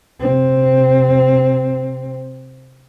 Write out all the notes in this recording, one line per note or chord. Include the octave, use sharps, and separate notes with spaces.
C3 C4